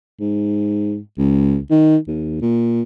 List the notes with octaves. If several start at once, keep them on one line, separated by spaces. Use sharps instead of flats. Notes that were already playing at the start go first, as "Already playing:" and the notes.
G#2
C#2
D#3
D#2
A#2